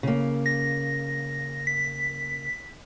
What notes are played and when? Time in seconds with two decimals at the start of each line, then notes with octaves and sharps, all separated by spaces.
0.03 C#3 A#3
0.46 A#6
1.67 B6